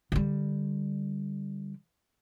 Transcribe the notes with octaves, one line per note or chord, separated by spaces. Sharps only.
D3 G3